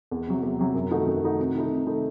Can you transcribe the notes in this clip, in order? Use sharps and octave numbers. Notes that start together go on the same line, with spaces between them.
E2
C3 F#3
E2
C3 F#3
F#2
D#3 A3 D#4 F#4
F#2
D#3 A3 D#4 F#4
C3
D#3 A3 D#4
C3
D#3 A3 D#4